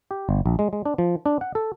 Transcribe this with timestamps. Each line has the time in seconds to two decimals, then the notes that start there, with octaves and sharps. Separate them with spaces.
0.11 G4
0.29 G1
0.46 A#1
0.59 G#3
0.73 G#3
0.86 D4
0.98 F3
1.26 D4
1.41 F#5
1.55 A4